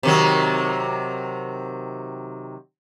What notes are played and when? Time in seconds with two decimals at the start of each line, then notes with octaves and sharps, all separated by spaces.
0.03 C3 D#3 F#3